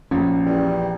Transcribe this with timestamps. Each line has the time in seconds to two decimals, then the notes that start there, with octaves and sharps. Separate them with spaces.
0.11 A#1 C#4
0.46 E2 G3